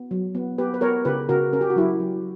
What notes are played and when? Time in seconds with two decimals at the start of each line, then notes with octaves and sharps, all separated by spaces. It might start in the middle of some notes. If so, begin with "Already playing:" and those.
Already playing: B3
0.11 F#3
0.35 B3
0.58 B3 G4 B4
0.74 B4
0.81 B3 A#4 C#5
1.05 C#3 G4 B4
1.29 C#3 F#4 A#4
1.53 C#4 A#4
1.61 G4
1.70 F#4
1.76 F#3 E4 G4
2.00 F#3